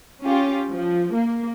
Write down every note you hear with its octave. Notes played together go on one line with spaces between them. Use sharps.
C#4 F4 G4
F3
A#3